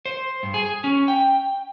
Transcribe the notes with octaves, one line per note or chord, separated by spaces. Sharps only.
C5
G2
G#4
C#4
G5